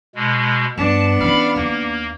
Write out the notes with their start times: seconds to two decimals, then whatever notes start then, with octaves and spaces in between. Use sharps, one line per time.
0.15 B2 G#3
0.77 G2 B3 D4 A5
1.20 E3 C#4 F5 B5 F6
1.56 D#2 A#3